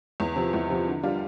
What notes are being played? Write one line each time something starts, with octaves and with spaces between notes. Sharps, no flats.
E2
C3 F3
E2
C3 F3
D3
G3 D4 F4